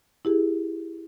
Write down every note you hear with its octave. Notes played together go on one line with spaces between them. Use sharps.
E4 G4 G#4